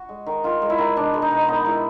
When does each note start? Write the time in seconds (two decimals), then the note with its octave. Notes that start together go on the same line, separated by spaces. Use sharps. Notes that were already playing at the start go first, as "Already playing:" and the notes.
Already playing: F#4
0.09 G#3
0.26 D#3
0.44 D#3 F4
0.62 G#3
0.70 E4
0.78 D#3
0.96 B2 D4
1.14 G#3
1.22 D#4
1.31 B2
1.48 B3 D#4
1.66 G#3 E4